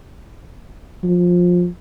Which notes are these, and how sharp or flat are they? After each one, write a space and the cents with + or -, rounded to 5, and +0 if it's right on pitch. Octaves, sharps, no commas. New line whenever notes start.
F3 +20